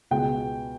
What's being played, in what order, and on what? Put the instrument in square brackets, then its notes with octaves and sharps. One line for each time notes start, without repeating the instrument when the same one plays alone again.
[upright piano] C#2 B2 G#3 G5